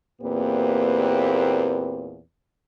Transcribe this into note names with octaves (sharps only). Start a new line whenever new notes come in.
E2 A#2 A#3 C4 G4 B4